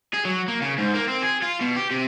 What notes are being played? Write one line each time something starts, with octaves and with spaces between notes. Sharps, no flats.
G#4
F#3
A#3
C#3
G#2
A#3
C4
G#4
F4
B2
G4
C3